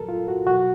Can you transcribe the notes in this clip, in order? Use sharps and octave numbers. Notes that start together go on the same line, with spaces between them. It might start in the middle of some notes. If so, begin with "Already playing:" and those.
Already playing: A#2 F#3 A4 A#4
F4
F#4
B2 F#3 F#4